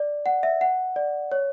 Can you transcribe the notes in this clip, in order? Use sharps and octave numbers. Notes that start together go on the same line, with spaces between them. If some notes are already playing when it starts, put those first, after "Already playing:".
Already playing: D5
F#5
E5
F#5
D5
C#5